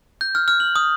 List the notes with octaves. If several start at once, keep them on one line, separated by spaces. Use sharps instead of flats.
G6
F6
F6
F#7
D#6